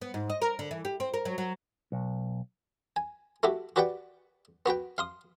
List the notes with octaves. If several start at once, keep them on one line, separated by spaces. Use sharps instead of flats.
B3
G#2
D#5
A#4
D3
E3
G4
C4
A#4
F#3
F#3
B1
G#5
A3 E4 F#4 G4
F#4 G4 B4 D5 F#5 G5
B3 F#4 B4 G5
F5 C6 D#6